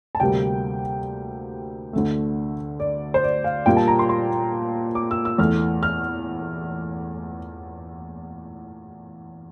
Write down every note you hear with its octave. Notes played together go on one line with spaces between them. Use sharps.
A5
D2 C3 G3 A#3 G5
D2 D3 A3
D5
C5
D5
F5
A#2 G3 A#3 G5
A5
A#5
C6
C6
D6
E6
E6
E2 E3 A3 F6
F6